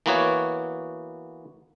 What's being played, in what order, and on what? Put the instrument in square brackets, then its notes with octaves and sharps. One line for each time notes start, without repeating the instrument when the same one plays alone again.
[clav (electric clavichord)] E3 A#3 B3 F#4 C#5